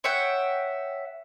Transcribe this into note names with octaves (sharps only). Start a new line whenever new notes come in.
C#5 E5 F#5 G5